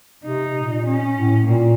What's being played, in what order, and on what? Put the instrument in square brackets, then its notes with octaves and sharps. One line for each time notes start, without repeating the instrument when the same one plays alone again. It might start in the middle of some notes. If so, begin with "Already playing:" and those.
[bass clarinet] C3 [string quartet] D#4
[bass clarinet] A#2
[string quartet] C#4
[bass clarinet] A2
[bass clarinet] A#2 [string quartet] A#3